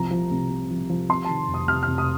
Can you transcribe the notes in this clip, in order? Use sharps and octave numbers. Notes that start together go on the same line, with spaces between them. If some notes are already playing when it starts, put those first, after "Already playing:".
Already playing: C2 F3 A#5
F3
C2
C4
F3
F3
C3 C6
D#3 A5
F1
D#6
C3 F6
F6
F2
D#6